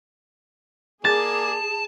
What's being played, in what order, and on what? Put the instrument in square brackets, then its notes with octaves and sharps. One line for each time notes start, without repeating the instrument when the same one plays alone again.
[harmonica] A#3 D5 G#5 [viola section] G#4 [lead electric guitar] A5 [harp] A6